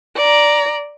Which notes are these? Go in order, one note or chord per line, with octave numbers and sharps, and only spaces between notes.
D5 A#5